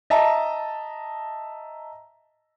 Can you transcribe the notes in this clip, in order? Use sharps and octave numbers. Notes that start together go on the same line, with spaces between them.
D#5 E5 A5 A#5